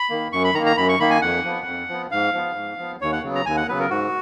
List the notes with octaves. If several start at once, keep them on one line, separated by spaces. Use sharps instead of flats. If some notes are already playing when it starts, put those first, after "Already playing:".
Already playing: B5
D#3 A#3
F#2 C#6
B5
D#3 A#3 A#5
A#5
F#2 B5
C#6
D#3 A#3 B5
G#5
F2 F#5
F3 B3
F2
F3 B3
G#2 F5
F3 B3
G#2
F3 B3
D#2 C#5
F#5
C#3 F#3 B3
A#5
D#2 G#5
F#5
C#3 F#3 B3 B4
A#4
G#2 F#4